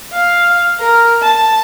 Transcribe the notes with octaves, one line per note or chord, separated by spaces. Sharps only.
F5
A#4
A5